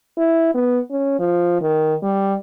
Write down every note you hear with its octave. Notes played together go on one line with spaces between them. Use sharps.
E4
B3
C#4
F3
D#3
G3